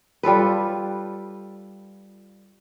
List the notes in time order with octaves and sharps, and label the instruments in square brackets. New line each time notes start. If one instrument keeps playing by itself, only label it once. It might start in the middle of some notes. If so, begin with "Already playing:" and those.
[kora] G3 F4 A4 B4